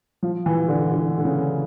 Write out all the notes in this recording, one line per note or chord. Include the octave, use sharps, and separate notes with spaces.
F3
E3
D3
D3
D3
C#3